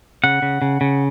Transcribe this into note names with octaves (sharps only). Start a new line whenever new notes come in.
C#3 F#5
C#3
C#3
C#3